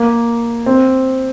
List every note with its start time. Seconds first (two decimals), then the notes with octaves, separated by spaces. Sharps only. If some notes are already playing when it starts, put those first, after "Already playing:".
Already playing: A#3
0.66 C4